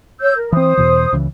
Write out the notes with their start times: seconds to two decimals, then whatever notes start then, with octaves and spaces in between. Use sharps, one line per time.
0.20 C#5 E6 G6
0.36 A#4
0.52 E3 C4 C5 D#6
0.77 E2 B2 E3
1.12 C#2 C#3 E3